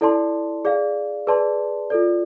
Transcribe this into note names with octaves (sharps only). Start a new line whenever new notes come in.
E4 A4 D5 A5 C6
G#4 D5 F5
G#4 B4 D5 A5 C6
F4 A4 D5